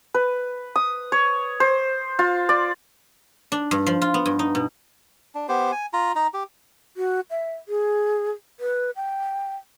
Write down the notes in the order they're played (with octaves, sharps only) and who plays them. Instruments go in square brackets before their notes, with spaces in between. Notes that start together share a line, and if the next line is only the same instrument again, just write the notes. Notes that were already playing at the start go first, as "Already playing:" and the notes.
[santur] B4
D#6
C#5
C5
F4
D5
[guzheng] D4
G2
F3
F4
B3
G2
D#4
B2
[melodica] D4
B3 G4 C5
G#5
F4 A#5
D#4 A#5
G4
[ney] F#4
E5
G#4
B4
G5